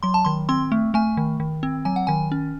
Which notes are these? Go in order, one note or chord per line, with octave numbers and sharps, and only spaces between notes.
F#3 C6
A5
D#3 C6
C4 C6
A3
A3 G#5
D#3
D#3
C4
F#3 G#5
F#5
D#3 G#5
C#4